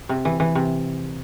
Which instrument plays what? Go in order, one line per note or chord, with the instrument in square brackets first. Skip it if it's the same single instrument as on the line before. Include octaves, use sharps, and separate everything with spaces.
[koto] C3
E3
E3
C3